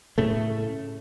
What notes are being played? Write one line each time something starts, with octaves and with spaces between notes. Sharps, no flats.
A2 C#3 A3